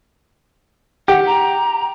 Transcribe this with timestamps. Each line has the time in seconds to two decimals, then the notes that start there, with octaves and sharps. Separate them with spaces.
1.08 G4 F#5
1.26 A#5